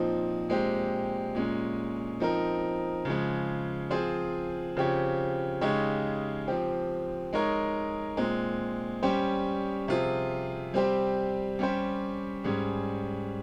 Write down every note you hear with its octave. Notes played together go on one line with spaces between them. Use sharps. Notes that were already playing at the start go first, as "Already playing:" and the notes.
Already playing: A#2 F3 C4 D#4
A#2 G#3 C4 G4
A#2 G#3 C#4
F3 C4 D#4 A#4
C#3 F3 G#3
F3 C4 F4 G#4 C5
C#3 F3 C4 G4 C#5
C#3 G#3 D#4 G4 C#5
F3 C4 G4
G#3 D#4 A#4 C#5
A#2 G#3 C4
G3 C#4 G4 C5
C3 F3 C4 F4 G#4
G3 C4 G4 C5
G3 C#4 G4 C5
G#2 G3 C#4 G#4